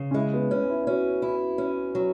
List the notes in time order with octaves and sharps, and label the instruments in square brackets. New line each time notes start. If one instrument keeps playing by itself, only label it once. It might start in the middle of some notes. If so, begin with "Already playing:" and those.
Already playing: [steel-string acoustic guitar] C#3
[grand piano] C#4
[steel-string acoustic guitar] G#3 [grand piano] E4
[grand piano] B3
[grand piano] B3 [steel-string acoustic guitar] C#4
[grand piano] E4
[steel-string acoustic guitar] C#4 [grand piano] F#4
[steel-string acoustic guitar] E4
C#4
F#3